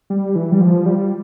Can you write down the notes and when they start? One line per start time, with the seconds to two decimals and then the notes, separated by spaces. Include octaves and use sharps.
0.10 G3
0.36 E3
0.52 G3
0.61 F3
0.86 G3